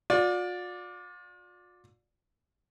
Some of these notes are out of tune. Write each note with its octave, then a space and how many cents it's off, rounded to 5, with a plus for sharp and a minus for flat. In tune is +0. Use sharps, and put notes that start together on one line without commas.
F4 +45 D5 +0